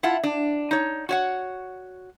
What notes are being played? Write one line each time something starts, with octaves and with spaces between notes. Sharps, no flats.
E4 F4 F#5 A5
D4
D#4 C#5
F#4 C#5 F#5